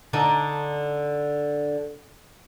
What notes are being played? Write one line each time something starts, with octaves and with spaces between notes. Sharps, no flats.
D3 D4 D#4